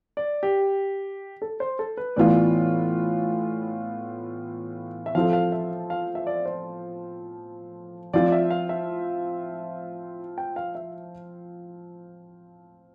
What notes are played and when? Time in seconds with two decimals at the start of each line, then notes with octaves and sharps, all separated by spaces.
0.17 D5
0.43 G4
1.42 A4
1.60 C5
1.79 A4
1.97 B4
2.16 A2 E3 B3 F4 D5
5.06 E5
5.15 F3 C4 F4 A4 F5
5.33 F5
5.52 E5
5.90 F5
6.15 E5
6.27 D5
6.46 C5
8.13 F3 C4 F4 D5
8.28 D5
8.32 E5
8.50 F5
8.69 E5
10.38 G5
10.56 F5
10.75 E5